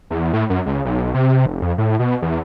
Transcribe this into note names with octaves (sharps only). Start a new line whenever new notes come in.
E2
A2
F#2
C#2
B1
C3
F1
F2
A2
B2
E2